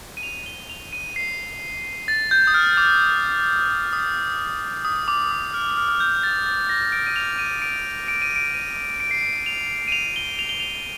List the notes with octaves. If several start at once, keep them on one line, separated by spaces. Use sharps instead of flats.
D#7
F7
G7
F7
D#7
C7
A6
G6
D#6
F6
D6
D#6
D#6
D6
D#6
F6
F6
F6
G6
A6
A6
A#6
D7
D#7
F7
D#7
D7
D7
D#7
D7
D#7
D7
C7
D7
F7
D#7
F7
G7
F7
G7
F7